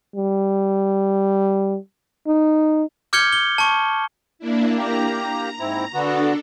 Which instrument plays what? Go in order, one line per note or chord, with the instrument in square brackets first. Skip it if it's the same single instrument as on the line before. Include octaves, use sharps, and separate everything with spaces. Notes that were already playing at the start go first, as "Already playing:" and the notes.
[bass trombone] G3
D#4
[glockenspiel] D6 F6 G6 G#6 C#7 G7
G7
A5 C#6
[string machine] A#3 D4 E4
[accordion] A#3 G4 [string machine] A#5
[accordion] G#2 C4 E4
[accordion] D3 B3 F#4 [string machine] D4 A4